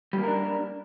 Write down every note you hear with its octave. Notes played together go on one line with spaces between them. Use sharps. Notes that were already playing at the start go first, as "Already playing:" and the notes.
G3 A#3 D4 A#4